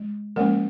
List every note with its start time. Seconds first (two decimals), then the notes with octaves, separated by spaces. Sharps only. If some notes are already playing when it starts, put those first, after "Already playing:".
Already playing: G#3
0.36 F3 G#3 A#3 C#4 A#4